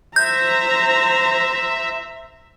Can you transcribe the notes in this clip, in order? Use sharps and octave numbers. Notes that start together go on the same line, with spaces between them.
C5 E5 A#5 G6